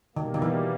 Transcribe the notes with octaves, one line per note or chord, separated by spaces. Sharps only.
B2 D#3 G3 A#3
D#3
E3